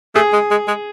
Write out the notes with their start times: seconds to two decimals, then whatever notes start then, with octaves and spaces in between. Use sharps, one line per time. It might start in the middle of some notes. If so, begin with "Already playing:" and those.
0.15 A3 G#4
0.33 G#3
0.51 G#3
0.68 G#3